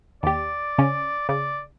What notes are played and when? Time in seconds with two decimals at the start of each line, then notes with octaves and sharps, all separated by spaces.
0.23 D#2 G4 D5
0.78 C#3 C#4
1.29 C#3 D5